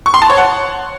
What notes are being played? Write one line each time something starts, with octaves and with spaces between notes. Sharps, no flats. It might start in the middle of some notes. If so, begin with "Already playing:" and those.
C#6
C6
A5
C#5
F#5